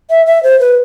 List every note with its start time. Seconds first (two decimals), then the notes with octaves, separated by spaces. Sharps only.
0.10 E5
0.26 E5
0.43 C5
0.60 B4